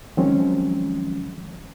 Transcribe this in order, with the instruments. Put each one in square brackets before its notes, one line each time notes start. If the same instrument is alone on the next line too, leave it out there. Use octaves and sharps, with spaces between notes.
[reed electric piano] D#3 F3 F#3 G#3 C4 C#4